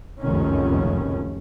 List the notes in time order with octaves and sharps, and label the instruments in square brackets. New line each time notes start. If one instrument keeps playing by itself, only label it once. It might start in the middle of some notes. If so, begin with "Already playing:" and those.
[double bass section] F1 C#2 F#2 A#2 D#3 C#4